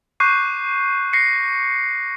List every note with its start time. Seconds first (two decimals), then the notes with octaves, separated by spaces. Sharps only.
0.20 C#6 D6 F#6 G6 C7 D#7
1.13 A#6 C7 C#7